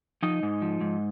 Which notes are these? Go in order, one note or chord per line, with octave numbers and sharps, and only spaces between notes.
F3 D#4 D#5
G#2
F3
G#2